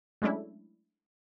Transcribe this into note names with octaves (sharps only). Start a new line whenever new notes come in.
F#3 G#3 A3 C#4 D4 E4